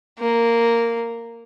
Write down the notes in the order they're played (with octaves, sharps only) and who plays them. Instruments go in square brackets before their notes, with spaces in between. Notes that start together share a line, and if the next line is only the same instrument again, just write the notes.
[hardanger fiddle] A#3